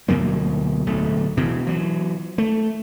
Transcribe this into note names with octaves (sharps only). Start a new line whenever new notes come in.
D2 B2 F#3 A#3
D1 B1 A3
B2 E3
E3 F#3
A3